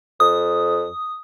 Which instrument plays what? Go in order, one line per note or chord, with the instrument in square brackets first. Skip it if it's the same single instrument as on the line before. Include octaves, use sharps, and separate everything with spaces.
[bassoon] F2 [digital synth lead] D#6